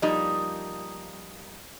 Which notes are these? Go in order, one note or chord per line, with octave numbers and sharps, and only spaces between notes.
F3 G3 A#3 D#4 D#5